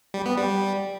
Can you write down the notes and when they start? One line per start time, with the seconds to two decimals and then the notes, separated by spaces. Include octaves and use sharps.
0.14 G3
0.26 B3
0.37 G3